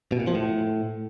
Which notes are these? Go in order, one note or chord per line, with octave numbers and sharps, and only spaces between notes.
B2
A#2
F3
A2